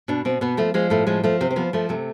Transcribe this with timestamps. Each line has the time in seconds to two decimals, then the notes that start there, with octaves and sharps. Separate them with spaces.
0.08 B2 D4
0.25 B2 C4
0.41 B2 B3
0.57 F3 A3
0.74 F3 G#3
0.90 A2 A3
1.07 F3 G#3
1.24 F3 A3
1.41 C3 C4
1.51 C4
1.56 F3 B3
1.73 F3 A3
1.89 C3 A3